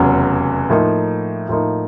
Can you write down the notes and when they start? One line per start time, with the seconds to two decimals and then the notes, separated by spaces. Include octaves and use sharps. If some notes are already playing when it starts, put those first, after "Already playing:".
Already playing: F1 E2 C#3 F#3
0.70 A2 F3 A#3 D#4
1.49 A2 F3 A#3 D#4